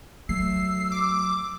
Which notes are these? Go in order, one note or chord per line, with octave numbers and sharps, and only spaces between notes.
F#3 A3 E6 C7
D6